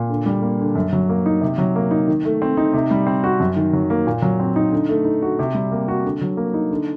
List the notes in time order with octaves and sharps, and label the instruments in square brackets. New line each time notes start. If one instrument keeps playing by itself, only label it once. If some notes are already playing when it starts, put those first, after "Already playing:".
Already playing: [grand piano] A#2
D3
G3
A#3
D3
F#2
F#3
A#3
D#4
C3
F#3
A#3
D#4
D#3
A3
C4
D#4
C3
G3
C4
F#4
F#2
D#3
F#3
A#3
A#2
F#3
C4
D#4
D3
A3
D#4
F#4
C3
G3
A#3
F#4
D3
F#3
A#3
D#4
D3